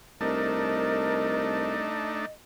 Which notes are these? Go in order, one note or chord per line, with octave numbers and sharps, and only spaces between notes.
C2 A3 D4 D#4 A#4 D#5